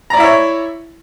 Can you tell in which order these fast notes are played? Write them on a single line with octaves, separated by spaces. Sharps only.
A#5 D5 E4 E5 C#5